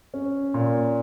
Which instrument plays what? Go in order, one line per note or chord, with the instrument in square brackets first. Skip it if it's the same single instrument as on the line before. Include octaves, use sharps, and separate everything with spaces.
[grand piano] C#4
A#2